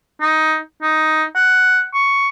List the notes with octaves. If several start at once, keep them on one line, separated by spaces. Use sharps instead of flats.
D#4
D#4
F#5
C#6